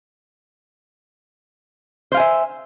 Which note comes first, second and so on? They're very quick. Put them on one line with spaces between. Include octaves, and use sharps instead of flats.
C5 F5 G#5 E5